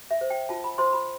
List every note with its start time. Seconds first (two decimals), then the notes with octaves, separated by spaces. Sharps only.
0.11 E5
0.21 C5
0.30 G5
0.49 F4 A5
0.64 B5
0.78 C5 C6
0.93 B5